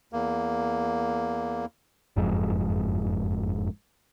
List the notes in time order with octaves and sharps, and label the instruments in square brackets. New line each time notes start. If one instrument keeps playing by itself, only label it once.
[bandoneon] E2 A#3
[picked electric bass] F#1 F2 G#2